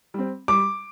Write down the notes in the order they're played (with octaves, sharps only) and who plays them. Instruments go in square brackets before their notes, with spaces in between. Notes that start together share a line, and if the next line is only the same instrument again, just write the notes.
[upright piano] G3 C4
[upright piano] G3 [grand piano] D6